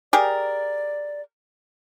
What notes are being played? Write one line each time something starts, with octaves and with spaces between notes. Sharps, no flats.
G4 G#4 A#4 D5